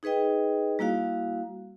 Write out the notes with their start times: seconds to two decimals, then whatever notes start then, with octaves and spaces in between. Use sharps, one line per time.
0.03 D#4 G#4 B4 D#5 G5
0.79 G3 A#3 E4 F#4 F5